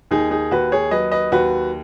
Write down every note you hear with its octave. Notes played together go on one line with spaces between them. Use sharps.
D#2 D#4 G#4
D#4 G#4
D#2 F#4 B4
G#4 C#5
F#3 B4 D#5
B4 D#5
D#2 F#4 B4